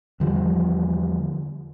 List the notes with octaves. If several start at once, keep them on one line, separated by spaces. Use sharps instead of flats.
E2 D3 F3 G3